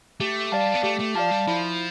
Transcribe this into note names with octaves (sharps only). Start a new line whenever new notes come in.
A3 G4
G3 D5 F5 A5
B3
A3 G4
A3
F3 D5 F5 A5
G3
F3 E4